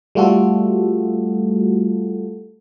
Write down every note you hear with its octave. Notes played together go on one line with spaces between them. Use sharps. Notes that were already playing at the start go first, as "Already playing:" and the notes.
G3 A3 F4 F#4 A4